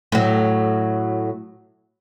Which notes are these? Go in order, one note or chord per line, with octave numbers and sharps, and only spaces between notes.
A2 F#3